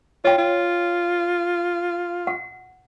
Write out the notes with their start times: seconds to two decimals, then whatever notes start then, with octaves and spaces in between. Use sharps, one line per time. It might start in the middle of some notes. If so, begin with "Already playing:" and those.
0.25 F4 C#5 G5
0.38 F4
2.27 F#5